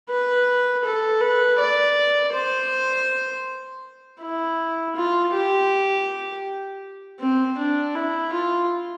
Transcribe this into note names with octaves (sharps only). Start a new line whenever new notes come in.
B4
A4
B4
D5
C5
E4
F4
G4
C4
D4
E4
F4